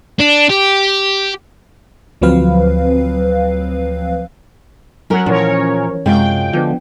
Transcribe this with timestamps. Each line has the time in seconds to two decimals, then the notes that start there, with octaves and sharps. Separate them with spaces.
0.19 D4
0.49 G4
2.22 D2 F3 F#3 C4 B4 F5
5.10 F#3 C#4 F#4 A#4 F#5
5.26 A#2 E3 F3 C#4 A#4 C#5
6.06 F#2 C3 G#3 F4 F#4 G5
6.53 D3 F3 B3 D4